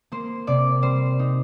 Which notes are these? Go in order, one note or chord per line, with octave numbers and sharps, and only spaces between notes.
A#3 C5
C3 D5
G3 C5
D#4